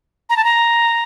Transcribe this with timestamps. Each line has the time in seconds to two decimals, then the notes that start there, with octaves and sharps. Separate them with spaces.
0.30 A#5
0.37 A5
0.44 A#5